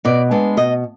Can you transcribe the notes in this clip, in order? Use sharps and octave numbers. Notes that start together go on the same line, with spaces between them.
B2 D5
G#3 B3 D4
B2 D#5